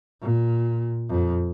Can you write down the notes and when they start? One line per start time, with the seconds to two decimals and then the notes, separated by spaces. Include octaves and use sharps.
0.22 A#2
1.10 F2